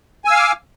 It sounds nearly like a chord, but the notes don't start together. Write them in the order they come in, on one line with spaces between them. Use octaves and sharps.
G#5 E6 F5 F6 D6